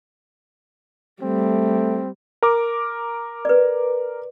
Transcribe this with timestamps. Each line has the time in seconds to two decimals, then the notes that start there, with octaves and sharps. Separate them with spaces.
1.22 G3 A3 C4
2.43 A#4 D6
3.45 B4 D5